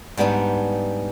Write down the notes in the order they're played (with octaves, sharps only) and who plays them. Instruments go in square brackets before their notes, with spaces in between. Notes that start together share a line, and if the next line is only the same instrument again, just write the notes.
[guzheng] G#2 G3 B3 D4 D#4